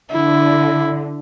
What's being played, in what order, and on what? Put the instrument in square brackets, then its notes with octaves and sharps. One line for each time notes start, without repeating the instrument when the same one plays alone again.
[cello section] D3 [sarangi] E4